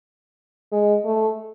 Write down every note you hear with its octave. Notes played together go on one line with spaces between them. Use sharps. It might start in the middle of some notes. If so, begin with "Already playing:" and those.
G#3
A3